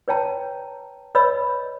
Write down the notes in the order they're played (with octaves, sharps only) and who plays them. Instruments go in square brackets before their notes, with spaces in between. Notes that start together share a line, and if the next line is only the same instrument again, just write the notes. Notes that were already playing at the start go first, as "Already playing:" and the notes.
[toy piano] B4 C#5 G5 A5 A#5
B4 C#5 D#5 B5 E6